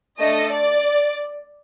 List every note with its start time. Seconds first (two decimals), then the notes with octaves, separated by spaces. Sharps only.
0.19 A3 D4 A4 D#5
0.52 D5